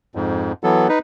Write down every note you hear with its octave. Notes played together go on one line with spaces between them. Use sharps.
F2 G#2
E3 F#3 B3 A4
D#4 B4